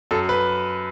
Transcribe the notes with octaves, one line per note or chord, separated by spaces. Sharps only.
F#2 A4
B4